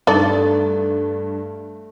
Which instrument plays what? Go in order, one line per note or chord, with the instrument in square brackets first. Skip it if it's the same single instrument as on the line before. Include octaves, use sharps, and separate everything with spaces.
[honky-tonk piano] G2 [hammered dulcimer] A3 [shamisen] D#4 A4 D5